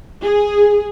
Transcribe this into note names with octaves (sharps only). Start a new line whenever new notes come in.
G#4